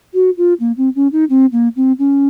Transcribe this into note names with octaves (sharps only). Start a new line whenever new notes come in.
F#4
F4
A#3
C4
C#4
D#4
C4
A#3
C4
C#4